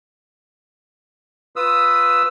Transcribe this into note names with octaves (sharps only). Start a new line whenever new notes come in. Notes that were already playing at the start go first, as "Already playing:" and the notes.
F4 B4 D#6 E6